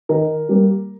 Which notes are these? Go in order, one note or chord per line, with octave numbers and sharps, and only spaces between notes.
D#3 A#4
G3 A#3